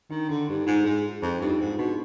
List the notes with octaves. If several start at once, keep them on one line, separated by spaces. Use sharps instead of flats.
D#3 D4
D3 D4
G2 D#4
G#2 F4
G#2
F2
G2 D#4
F4
G#2 D#4
B2 D4